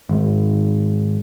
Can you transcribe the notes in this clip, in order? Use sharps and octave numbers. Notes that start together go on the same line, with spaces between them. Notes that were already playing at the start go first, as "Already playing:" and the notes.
G#1